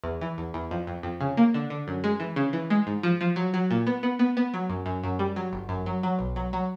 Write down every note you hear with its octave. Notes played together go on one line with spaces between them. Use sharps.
E2
E3
E2
E2
F2
F2
F2
C#3
A#3
D3
D3
F#2
G#3
E3
C#3
E3
G#3
G#2
F3
F3
F#3
F#3
A#2
B3
B3
B3
B3
F#3
F#2
F#2
F#2
G3
F#3
G1
F#2
F#3
F#3
B1
F#3
F#3